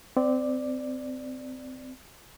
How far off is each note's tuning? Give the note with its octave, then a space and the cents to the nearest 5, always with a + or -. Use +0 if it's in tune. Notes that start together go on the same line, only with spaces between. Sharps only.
C4 -25 D5 +5